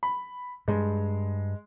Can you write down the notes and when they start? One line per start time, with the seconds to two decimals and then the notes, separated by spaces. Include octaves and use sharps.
0.03 B5
0.68 G2 G#3